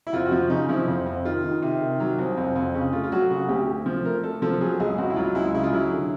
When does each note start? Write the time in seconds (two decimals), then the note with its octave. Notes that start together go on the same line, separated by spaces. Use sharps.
0.07 E4
0.13 F2 F4
0.25 F#4
0.31 F3 F4
0.50 C#3 D#4
0.69 F3 E4
0.88 F2
1.06 F2
1.25 D#3 F4
1.44 D#3
1.62 C3
1.82 D#3
2.00 F#3
2.18 C2
2.37 F2
2.56 F2
2.74 C#3
2.93 A3 F4
3.03 F4
3.12 F#3 F#4
3.30 C#3 F#4
3.49 D2 G4
3.67 A3
3.86 F3
4.05 A3 A#4
4.23 A3 A4
4.42 F3 A4
4.61 F#3 G#4
4.80 C#2 G#4
4.98 C#2 F#4
5.10 E4
5.16 F#3 F4
5.35 C#2 E4
5.54 C#3 E4
5.64 F4
5.73 F#3 E4
5.91 D3